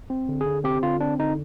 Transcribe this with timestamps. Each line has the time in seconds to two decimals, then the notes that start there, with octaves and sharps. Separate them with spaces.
0.10 C4
0.29 D3
0.41 G#4
0.46 D3
0.64 C4 G4
0.83 D3 F4
1.00 C4 D4
1.19 D3 D#4